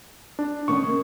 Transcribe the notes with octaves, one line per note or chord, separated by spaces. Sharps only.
D4
D#3 B3 C#4 C#6
C#3 A#3